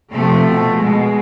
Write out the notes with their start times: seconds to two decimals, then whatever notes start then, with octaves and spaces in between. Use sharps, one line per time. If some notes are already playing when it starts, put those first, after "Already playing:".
0.12 C3 F3 A3
0.47 B2
0.81 B2 G#3